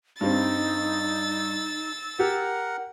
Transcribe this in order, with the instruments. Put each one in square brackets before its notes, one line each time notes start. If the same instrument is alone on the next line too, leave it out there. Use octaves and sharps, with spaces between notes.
[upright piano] G2 G3 C4 [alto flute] D#4 [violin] E6 A6
[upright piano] G4 [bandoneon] A#4 F#5